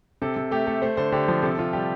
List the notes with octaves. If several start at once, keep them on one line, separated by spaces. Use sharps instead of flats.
C3 A4
C3
A3 G4
A3 A4
A3 C5
D3 C5
D3 G4
F3
C3 A4
C3 F4
G3 G4